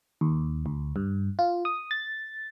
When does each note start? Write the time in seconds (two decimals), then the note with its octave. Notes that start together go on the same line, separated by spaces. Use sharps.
0.21 D#2
0.66 D2
0.96 G2
1.39 F4
1.65 D#6
1.91 A6